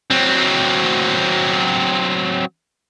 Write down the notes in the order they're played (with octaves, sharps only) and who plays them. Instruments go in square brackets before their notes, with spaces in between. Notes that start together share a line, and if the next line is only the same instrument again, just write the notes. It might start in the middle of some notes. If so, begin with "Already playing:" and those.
[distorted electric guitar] F#3 C4